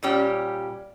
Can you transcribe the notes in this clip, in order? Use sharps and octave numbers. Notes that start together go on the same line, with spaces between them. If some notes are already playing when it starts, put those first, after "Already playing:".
A#2 G3 C#4 G4